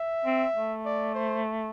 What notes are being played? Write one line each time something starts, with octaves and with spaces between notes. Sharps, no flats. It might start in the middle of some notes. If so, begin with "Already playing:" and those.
Already playing: E5
C4
A3
D5
C5